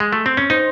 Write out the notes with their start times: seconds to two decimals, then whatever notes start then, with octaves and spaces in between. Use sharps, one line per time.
0.00 G#3
0.13 A3
0.26 C4
0.37 C#4
0.50 D#4 C5